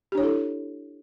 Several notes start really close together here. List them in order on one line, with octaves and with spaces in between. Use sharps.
G4 D4 C#5 E4 A4